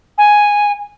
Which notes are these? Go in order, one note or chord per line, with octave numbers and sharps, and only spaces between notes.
G#5